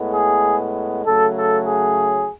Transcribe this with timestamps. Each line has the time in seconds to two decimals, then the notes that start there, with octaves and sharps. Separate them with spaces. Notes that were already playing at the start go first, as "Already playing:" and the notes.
Already playing: A2 G#3 B3
0.14 G#4
1.06 C#3 F#3 A3 A4
1.36 A4
1.67 G#4